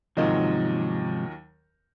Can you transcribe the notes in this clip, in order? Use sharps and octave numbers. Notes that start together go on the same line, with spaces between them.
D#2 G#2 C3 D#3 F3 F#3 F4 D#5